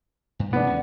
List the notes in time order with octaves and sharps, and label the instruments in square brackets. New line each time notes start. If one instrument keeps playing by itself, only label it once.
[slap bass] G2
[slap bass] A1 B2 G#3 [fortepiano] B3 D4
[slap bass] D#2 C#4